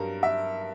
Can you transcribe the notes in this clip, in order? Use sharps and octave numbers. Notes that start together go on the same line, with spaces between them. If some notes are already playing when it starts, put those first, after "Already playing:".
Already playing: G2 F#3 A#4
E5